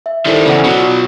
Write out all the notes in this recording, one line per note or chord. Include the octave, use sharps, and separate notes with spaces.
E5
D#3 G3 E4 A4 C5
E2 C#3 D5 F#5
B2 F#3
F4